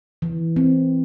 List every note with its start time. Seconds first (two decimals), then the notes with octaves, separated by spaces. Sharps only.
0.22 E3
0.56 C4